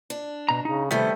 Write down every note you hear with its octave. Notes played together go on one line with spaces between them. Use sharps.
D4
B2 A#5
C#3 D#4
C3 D#3 G3 A3 B3 C5